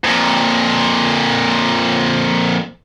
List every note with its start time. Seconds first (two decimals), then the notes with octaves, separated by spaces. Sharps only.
0.04 F2 A#2